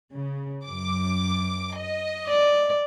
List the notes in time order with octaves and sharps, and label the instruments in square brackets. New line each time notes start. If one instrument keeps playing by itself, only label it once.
[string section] C#3
F#2 D6
D#5
[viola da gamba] D5